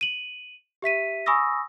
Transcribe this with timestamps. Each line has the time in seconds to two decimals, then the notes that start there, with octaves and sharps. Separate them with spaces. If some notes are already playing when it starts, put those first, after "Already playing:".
0.01 D#7 F#7
0.82 G4 E5 B6 D#7
1.26 G#5 B5 C#6 D#6 E6 A#6